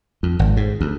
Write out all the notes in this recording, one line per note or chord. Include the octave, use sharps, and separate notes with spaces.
F2
G#1
G#2
D2